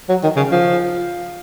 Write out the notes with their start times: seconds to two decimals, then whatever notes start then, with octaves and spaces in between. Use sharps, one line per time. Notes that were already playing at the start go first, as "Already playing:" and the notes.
0.09 F#3
0.23 D#3
0.36 C#3
0.51 F3